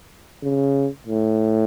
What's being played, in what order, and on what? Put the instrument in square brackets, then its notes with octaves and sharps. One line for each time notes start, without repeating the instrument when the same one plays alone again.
[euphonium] C#3
A2